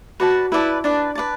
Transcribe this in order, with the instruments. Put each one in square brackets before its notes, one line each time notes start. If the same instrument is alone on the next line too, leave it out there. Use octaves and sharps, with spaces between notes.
[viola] F#4 [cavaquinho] B4 D5 A5
[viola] E4 [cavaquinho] B4 D5 A5
[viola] D4 [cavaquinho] B4 D5 A5
[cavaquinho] B4 D5 A5